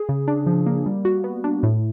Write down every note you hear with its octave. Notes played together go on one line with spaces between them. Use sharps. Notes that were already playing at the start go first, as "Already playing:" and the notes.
Already playing: G#4
C#3
D4
F3
A#3
G3
F#4
B3
D4
A2